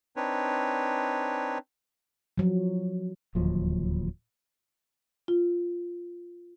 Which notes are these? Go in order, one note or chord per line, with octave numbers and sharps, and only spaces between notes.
C4 D4 D#4 B4 C#5
F3 F#3
D1 D#2 F3 F#3
F4